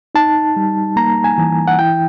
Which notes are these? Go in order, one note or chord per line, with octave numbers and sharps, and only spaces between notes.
D#4 A5
G3
A#3 A#5
G#5
E3
F#5
E4 G5